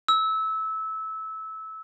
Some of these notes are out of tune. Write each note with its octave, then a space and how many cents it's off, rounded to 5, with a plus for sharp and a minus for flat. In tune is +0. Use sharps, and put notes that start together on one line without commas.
E6 -20